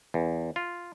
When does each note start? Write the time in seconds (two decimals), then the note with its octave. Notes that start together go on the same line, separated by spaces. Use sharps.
0.14 E2
0.56 F4